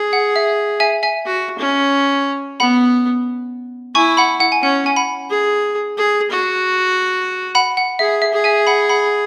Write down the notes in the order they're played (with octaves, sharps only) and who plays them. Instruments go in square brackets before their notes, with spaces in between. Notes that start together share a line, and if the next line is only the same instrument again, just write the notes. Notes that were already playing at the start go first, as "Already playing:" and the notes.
Already playing: [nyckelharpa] G#4
[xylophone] F#5
E5
E5 G#5
E5 G#5
[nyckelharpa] F#4
C#4
[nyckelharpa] B3 [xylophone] F#5 B5
[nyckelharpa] E4 [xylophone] G#5 C#6
[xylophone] F#5 B5
F#5
G#5
[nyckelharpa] C#4 [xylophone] F#5
[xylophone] G#5
F#5 B5
[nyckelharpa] G#4
G#4
F#4
[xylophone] F#5 B5
F#5
[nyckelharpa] G#4 [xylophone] E5
[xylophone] E5
[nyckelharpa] G#4
[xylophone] E5 G#5
F#5 B5
F#5 B5